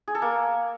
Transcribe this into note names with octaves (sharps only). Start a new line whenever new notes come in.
G#4
A4
A#3